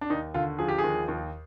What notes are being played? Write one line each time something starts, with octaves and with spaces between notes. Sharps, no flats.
D4
D#2 D#4
D3 F4
F3 G#4
G4
G#4
D#2
D#2